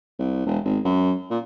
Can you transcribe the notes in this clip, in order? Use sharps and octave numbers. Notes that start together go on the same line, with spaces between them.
C2
E1
G#1
F#2
A#2